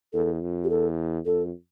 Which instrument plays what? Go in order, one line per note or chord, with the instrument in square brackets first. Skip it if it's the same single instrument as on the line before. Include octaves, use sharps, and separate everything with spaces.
[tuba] E2 [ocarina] A4
[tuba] F2
[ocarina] G4
[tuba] E2 [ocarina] A4
[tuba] F2 [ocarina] A4